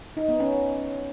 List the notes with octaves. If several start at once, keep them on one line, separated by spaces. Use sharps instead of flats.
D#4
B3
C#4